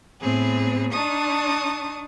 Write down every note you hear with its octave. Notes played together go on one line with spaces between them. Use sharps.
A2 B3 C4 G#4
D4 D#4 A5 C#6 D#6